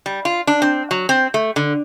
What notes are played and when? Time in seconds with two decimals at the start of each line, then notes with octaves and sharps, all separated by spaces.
0.06 G3
0.25 F4
0.47 D4
0.62 C4
0.91 F#3
1.09 C4
1.34 A3
1.56 D3